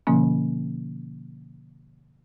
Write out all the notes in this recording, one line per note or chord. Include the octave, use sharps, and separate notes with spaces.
B2 D3 F3 A#3 C#4